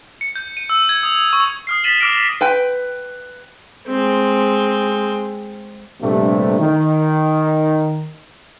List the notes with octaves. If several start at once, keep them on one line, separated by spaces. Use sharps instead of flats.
C#7
G6
D#7
E6
G#6
D#6
C#6
D#6 F6 C7
A6 B6 D#7 E7 F#7 G7
D6 F6 A#6 D7
B4 G5
G#3 C4
A#1 G2 C3 A3
D#3